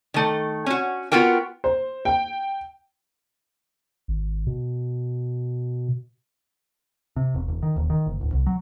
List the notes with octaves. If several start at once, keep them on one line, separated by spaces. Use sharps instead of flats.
D#3 A3
C#4 F#4
B3 F4 F#4 A#4 G5
C5
G5
G#1
B2
C3
E1
E1
D#3
D#1
D#3
F#1
D1
C2
F#3